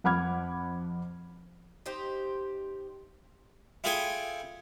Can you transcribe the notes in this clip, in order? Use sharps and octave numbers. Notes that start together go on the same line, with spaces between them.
F2 F#5 B5 D6 F6 G#6
D#4 G4 C5
E4 F4 G#4 A4 G5 G#5